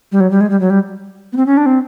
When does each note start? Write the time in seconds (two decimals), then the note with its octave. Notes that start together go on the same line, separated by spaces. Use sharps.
0.12 G3
0.20 F#3
0.31 G3
0.41 G#3
0.50 G3
0.60 F#3
0.70 G3
1.33 B3
1.37 C4
1.46 C#4
1.57 D4
1.66 C4